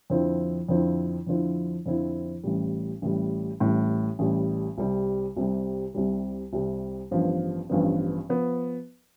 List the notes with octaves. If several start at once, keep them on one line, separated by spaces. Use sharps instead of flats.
F2 D3 F3 C4 E4
F2 D3 F3 C4 E4
F2 D3 F3 C4 E4
F2 D3 F3 C4 E4
A1 A2 G3
A1 A2 G3
A1 A2 G3
A1 A2 G3
C2 C3 G3
C2 C3 G3
C2 C3 G3
C2 C3 G3
A1 G2 F3 B3
A1 G2 F3 B3
F3 B3